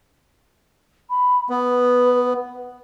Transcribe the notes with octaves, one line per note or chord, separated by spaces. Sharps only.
B5
B3 B4